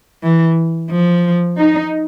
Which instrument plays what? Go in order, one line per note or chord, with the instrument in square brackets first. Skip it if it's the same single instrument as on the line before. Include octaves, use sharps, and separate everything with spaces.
[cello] E3
F3
[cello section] D#4